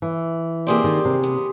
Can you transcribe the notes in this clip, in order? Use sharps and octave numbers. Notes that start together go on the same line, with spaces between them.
E3
A#3 C4 G4 G#4 C5 D5
D#3
C3
B3